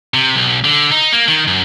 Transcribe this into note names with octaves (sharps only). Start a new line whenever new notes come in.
C3
B1
D3
D#4
A#3
D#3
F#2